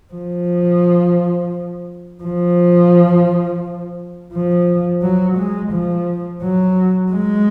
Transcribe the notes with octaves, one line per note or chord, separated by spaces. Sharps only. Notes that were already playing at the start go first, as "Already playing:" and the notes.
F3
F3
F3
F#3
G#3
F3
F#3
G#3